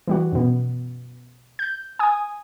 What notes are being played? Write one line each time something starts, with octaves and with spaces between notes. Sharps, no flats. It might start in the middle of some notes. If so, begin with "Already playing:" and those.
E3 G3 F#4
F#2 B2
G6
G#5 D#6